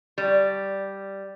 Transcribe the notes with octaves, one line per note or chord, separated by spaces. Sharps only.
G3